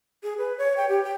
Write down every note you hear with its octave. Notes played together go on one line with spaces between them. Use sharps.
G#4
B4
C#5
G5
G4
G5